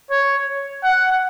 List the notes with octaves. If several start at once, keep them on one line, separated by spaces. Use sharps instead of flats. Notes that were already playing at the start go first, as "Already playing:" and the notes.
C#5
F#5